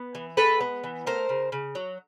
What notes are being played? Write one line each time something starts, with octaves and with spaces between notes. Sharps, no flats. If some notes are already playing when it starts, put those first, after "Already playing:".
Already playing: B3
E3
G#3 A4 B4
B3
E3
A3 A#4 C5
C#3
C#3
F#3